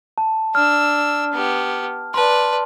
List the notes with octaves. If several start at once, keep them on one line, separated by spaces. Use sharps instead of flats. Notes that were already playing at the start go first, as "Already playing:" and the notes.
A5
D4 E6 F6
B3 G4
B4 D5 A5 C6